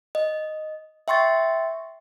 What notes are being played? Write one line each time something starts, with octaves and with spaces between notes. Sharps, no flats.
D#5
E5 G5 C6 C#6 A6